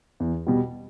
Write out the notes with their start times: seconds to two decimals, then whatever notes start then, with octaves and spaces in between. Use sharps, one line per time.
0.20 E2
0.47 B2 G3